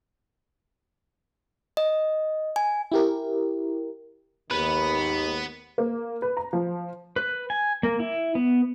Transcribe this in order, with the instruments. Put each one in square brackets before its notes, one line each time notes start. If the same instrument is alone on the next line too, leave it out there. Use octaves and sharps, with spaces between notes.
[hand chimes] D#5
G#5
[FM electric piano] E4 G4 A#4
[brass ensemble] D#2 G#2 D#3 [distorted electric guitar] B3 [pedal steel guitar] B4
[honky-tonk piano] A#3
B4
A#5
F3
[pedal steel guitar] B4
G#5
A#3
E4
B3